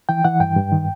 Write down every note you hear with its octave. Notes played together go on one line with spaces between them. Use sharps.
E3 G5
E3 F#5
G2 G5
G2
D#3